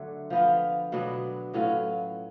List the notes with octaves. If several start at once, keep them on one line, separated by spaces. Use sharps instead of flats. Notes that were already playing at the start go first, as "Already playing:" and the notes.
Already playing: D3 F#3 A3
F3 B3 F4
B2 F#3 B3 D4
A2 F#3 C#4 F4